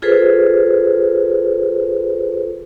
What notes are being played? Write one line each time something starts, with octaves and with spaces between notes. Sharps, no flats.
F4 G#4 A4 B4 C5